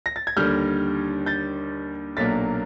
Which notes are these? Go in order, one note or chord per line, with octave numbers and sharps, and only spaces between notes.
A#6
A6
G#6
D#2 D3 G3 F6 G6
G6 A6
B1 A#2 F#3 A#3 D4 A6 B6